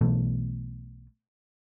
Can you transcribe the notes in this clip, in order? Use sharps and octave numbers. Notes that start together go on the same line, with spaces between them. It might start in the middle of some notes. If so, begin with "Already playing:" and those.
B1 B2 E3 A3